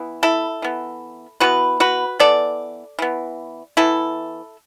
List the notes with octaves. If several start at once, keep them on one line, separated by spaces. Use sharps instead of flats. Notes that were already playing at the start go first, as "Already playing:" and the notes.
Already playing: E3 B3
E4 A4
E3 B3
E3 B3 F#4 B4
F#4 B4
E3 B3 A4 D5
E3 B3
E3 B3 E4 A4